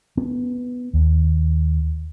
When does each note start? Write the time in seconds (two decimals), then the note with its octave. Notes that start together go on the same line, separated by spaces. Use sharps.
0.17 B3
0.93 D#2